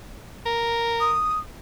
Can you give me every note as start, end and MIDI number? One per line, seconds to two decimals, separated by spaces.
0.46 1.17 70
1.01 1.39 87